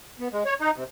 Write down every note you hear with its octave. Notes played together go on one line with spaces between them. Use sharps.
B3
G#3
C#5
D#4
C3